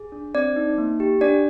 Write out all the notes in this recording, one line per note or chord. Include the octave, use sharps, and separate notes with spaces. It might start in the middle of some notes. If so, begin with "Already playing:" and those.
Already playing: G#4
D4
C4 D5
D#4
A#3
G4
D4 D5